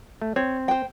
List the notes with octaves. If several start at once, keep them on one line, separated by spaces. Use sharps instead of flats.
A3
C4 C#5
C5 G5